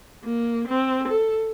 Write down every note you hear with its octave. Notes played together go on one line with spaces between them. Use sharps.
A#3
C4
A4